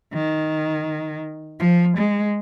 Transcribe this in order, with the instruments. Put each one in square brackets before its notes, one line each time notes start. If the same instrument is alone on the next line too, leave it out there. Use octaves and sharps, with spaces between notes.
[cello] D#3
F3
G#3